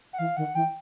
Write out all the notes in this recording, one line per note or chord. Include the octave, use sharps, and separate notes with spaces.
F#5
E3 F5
D#3 F#5
E3 G5